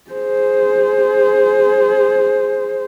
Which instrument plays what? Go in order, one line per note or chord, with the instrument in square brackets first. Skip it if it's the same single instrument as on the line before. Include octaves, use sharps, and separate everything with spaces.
[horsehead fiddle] G#4 C5